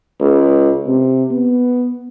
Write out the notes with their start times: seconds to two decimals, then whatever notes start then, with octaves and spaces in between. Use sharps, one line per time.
0.20 C#2
0.87 C3
1.31 B3